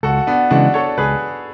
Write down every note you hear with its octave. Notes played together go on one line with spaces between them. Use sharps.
C#2 F#4 A4
B3 D4
C#3 E3 G#3 D4 F#4
A4 C#5
C#2 G#4 B4